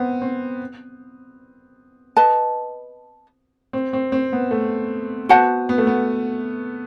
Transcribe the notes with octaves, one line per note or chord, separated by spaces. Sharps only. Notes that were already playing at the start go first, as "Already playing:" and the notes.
Already playing: B3 C4
C4
B4 D#5 A5
C4
C4
C4
B3
A3
B3 F#4 C5 F#5 A5
B3
A3
B3